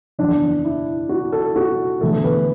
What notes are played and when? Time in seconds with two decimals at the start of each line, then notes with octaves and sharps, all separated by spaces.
0.18 F#1 E2 E3 D4
0.64 E4
1.09 F#4
1.33 A4
1.56 F#4
2.01 E1 E2 D3 A3 A4
2.24 B4